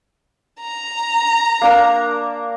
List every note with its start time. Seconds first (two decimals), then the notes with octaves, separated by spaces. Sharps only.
0.61 A#5
1.62 A#3 D4 A#4